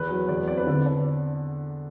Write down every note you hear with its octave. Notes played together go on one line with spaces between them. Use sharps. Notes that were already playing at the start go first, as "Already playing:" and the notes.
Already playing: E2 B4
F#3
E2 D5
C4 D5
B4
D3
D4